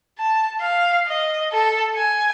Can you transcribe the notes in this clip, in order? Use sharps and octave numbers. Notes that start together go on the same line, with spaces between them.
A5
F5
D#5
A4
G#5